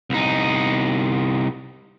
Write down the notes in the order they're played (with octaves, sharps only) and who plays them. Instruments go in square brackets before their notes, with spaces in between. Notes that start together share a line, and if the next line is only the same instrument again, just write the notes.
[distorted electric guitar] C2 D#4